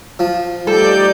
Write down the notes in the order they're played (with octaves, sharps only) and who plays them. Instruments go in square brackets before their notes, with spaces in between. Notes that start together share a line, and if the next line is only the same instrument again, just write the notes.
[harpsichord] F3
[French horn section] G3 A3 [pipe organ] D#4 D5 G6 [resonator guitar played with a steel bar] A4